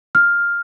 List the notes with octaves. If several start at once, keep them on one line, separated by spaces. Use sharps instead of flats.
F6